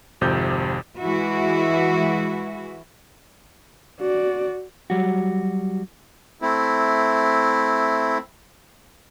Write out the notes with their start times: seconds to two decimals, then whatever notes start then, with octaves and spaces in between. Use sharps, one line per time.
0.21 G#1 F2 C3 G6
0.99 E3 G#3 E4 F#4
3.99 F#4 D5
4.90 F#3 G3 F#4
6.42 A3 C4 E4